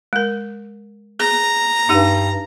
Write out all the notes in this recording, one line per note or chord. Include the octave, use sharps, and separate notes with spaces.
G#3 A#4
G#4 A#5
G2 D#4 G4 F#5